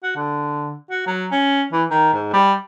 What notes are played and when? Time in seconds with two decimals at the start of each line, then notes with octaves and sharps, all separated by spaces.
0.03 F#4
0.16 D3
0.90 F#4
1.07 F#3
1.32 C#4
1.72 E3
1.91 D#3
2.14 G#2
2.33 G3